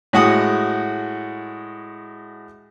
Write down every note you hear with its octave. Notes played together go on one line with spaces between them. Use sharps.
A2 G#3 F#4 F#5 D#6